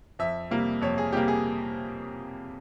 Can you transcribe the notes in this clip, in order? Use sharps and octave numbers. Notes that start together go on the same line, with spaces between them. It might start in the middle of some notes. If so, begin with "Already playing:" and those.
F2 E5
C3 G3 A#3
F2 C#5
G#4
C3 G3 A#3 G4
G#4